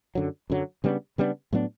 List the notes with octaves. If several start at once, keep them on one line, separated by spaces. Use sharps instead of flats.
F#2 D3 F#3
F#2 D3 F#3
C#3 G3 B3 D4
C#3 G3 B3 D4
A2 F#3 B3 D4